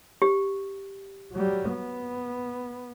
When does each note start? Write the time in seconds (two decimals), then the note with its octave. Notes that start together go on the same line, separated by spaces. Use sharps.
0.22 G4
1.33 F#3 G3
1.71 B3